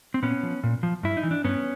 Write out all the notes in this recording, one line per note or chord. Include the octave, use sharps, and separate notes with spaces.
C4
A#2 B3 C#4
F3
A#2
F3
G2 E4
D#4
E3
D4
G2 B3 C#4